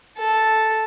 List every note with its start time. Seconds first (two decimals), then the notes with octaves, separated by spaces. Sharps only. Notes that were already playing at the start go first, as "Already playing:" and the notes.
0.18 A4